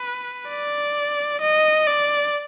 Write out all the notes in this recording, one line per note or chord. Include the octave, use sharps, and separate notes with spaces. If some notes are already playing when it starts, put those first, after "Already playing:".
Already playing: B4
D5
D#5
D5